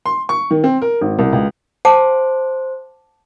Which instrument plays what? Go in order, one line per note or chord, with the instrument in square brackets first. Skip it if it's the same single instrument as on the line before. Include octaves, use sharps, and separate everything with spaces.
[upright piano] C6
C#6
D#3
C4
A#4
G#1
C2
C#2
[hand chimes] C5 [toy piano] F#5 A5 D6